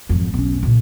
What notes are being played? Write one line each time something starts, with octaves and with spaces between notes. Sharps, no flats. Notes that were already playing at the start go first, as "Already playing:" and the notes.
G#1 F2
B1 C#4
A#2 C#3